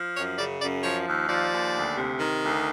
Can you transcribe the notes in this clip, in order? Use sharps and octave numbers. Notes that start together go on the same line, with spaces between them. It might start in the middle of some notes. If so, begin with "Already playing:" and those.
Already playing: F3
F#2 C#5
C#3 D5
F#2 D5
F3 C#5
D#2
F3 D5
D#2
D2
C3
D#3
D2